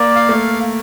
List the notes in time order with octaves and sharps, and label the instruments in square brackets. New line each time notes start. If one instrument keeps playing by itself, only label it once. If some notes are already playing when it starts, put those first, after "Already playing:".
Already playing: [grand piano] A#3 [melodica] D5
[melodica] F5
[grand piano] A3